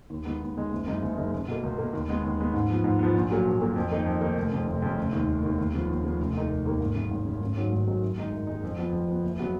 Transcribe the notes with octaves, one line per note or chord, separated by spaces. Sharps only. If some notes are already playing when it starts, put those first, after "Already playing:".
D#2
C#3 G#3 B3 D#4
D#2
C#3 G#3 B3 D#4
F#1
F#2 C#3 G#3 D#4
F#1
F#2 C#3 G#3 D#4
C#2
B2 A#3
C#2
B2 A#3
D#2
C#3 G#3 B3
D#2
C#3 G#3 B3
G#2
F3 B3
G#2
F3 B3
A#1
A#2 F#3 A#3
A#1
A#2 F#3 A#3
F2
D#3 A#3 D#4
F2
D#3 A#3 D#4
F1
F2 C#3
F1
F2 C#3
F1
D#2 D#3
F1
D#2 D#3
D#2
C#3 F3 B3
D#2
C#3 F3 B3
F1
D#2 D#3 A#3 D#4
F1
D#2 D#3 A#3 D#4
G#1
F#2 C#3
G#1
F#2 C#3
G#1
G#2 D#3 F#3 C#4
G#1
G#2 D#3 F#3 C#4
F#2
D#3 G#3 D#4
F#2
D#3 G#3 D#4
F2
F3 B3
F2
F3 B3
F#1
C#3 F#3 B3